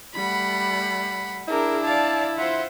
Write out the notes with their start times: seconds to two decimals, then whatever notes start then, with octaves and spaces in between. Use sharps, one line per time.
0.15 G3 A3 F#5 B5
1.48 D4 E4 G#4 A#4
1.85 D5 F5 A5
2.37 F4 C5 E5 F#5